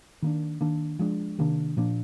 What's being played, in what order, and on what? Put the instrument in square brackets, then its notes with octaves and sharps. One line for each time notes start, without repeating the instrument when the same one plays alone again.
[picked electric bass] D#3 A#3 D4
D#3 A#3 D4
F3 G#3 D4
C3 D#3 A#3 D4
A#2 F3 A#3 D4